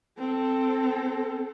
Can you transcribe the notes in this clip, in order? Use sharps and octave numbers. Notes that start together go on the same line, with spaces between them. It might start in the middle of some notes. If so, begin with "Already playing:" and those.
C4 A4